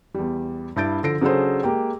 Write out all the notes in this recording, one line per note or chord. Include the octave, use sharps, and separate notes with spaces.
E2 G3
G2 E4 G6 A6 D7
D3 F3 A4 A#6 C7 D7
C#3 F#3 D4 G#4 A4 C5
G#3 A#3 G4 G5